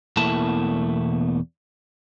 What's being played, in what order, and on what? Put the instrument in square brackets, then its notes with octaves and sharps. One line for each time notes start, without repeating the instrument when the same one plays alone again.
[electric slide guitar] E2 B2 A3 A#3 E4 A5